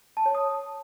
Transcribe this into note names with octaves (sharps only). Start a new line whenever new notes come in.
A5
C#5
D#6